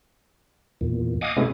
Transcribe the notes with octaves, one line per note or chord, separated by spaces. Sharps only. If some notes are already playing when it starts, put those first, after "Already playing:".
E2 A#2
D#5 F5 F#5 G#5 D6 D#6
C3 G#3 A3 B3 C#4 E4